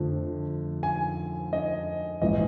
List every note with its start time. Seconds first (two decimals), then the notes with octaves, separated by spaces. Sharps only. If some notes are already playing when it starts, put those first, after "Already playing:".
Already playing: F2 D3 F3 A3
0.83 G#5
1.53 D#5
2.21 A#1 G#2 E3 D#5